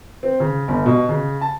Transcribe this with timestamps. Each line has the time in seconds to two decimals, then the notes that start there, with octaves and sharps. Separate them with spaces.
0.23 C4
0.40 C#3
0.68 G1
0.86 B2
1.09 C#3
1.41 A5